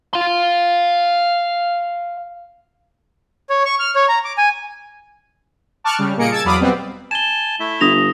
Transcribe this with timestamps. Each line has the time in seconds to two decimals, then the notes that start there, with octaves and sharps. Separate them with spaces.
0.13 F5 C6
3.50 C#5
3.65 C#6
3.79 F6
3.96 C#5
4.09 A#5
4.24 D6
4.38 G#5
5.84 A5 C#6 D6 F6 F#6
5.99 C#3 G3
6.17 A#2 A#3 G#4 D#5 C#7 D7
6.31 A5 E6 G#6 A6
6.44 E2 F#3 F5 B5 D6 D#6
6.59 B2 G3 B3 C4
7.11 G#5 A5 E7 G7
7.60 A3 E4 E5
7.81 G1 D#6 A#6 F7